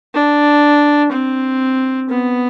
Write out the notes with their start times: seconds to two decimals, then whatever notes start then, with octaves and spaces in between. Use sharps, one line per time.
0.14 D4
1.12 C4
2.10 B3